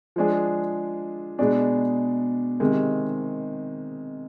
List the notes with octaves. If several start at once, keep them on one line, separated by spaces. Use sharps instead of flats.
F3 G#3 D4 G#4
B2 G#3 D4 G#4
C3 D#3 G#3